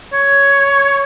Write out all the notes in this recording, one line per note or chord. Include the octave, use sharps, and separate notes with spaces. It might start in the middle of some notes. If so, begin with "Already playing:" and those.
C#5